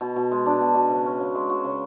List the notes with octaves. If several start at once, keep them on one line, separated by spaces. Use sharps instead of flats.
B2
B2
G#3
D4
B2
B2
C#3
C#4
C#3
G#3
F#4
C#3